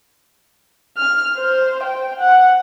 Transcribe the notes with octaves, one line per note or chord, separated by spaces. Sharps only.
F6
C5
G5
F#5